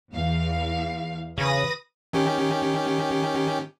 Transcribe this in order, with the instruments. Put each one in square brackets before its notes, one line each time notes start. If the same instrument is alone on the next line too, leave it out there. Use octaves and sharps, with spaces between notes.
[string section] E2 F5
[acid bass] C#3 [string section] B4 D#6 A#6
[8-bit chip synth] D#3 C#4 G4